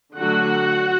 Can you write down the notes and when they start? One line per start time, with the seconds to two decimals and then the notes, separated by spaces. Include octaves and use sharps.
0.17 D3 F#3 A3 F#4 F#5